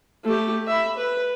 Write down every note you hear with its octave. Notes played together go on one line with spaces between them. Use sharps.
A3 G4
E5 B5
B4